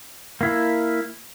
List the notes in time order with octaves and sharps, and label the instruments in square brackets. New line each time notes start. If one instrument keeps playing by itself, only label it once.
[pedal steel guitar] A#3 E4